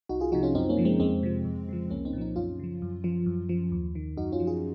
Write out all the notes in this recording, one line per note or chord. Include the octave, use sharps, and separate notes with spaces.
C2 D#4 F#4
F4 G#4
C3 F3 D#4 F#4
C#4 F4
F#2 C4 D#4
A#3 C#4
C#3 F3
G#3 C4
F2 G#3 C4
C3 F3
F2
C#3 F3
C2 A#3 C#4
C4 D#4
A#2
F3 C4 D#4
F#2 C#4 F4
C#3 F3
F#2
F3
F#2
F3
D#2
D#3
F#2 D#4 F#4
C#4 F4
F3
F4 G#4